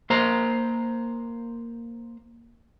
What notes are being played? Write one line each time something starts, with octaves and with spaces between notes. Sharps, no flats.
A#3 C5 A#5